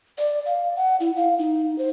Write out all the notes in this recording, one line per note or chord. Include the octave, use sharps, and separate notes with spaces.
D5
F5
F#5
E4
F5
D#4
C5